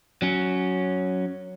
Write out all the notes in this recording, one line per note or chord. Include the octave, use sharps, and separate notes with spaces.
F#3 C#4